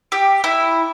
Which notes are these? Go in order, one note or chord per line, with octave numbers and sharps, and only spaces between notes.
G4
E4